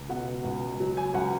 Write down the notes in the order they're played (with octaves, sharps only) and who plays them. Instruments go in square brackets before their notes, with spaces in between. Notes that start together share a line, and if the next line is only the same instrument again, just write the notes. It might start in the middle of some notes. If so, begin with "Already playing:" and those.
Already playing: [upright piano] C#2
B2 F#5
C#2
F#3
G#5
C#2 F#5